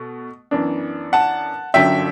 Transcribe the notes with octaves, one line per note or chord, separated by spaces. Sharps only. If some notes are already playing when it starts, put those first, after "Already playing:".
Already playing: B2 A3
F#2 E3 B3 D4
F#5 A5
G1 F#2 D3 F#3 E5 G5